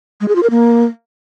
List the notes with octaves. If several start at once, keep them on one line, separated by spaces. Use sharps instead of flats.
G#3
G#4
F4
A#4
A#3